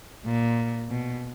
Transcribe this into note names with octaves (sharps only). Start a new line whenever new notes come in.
A#2
B2